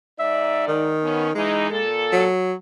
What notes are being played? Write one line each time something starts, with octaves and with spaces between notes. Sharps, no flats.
G#2 D#4 D5 E5
D#3
B3 C#4
E3 G#3 D#4
A#2 A4
F#3